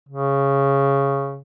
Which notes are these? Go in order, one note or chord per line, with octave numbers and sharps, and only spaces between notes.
C#3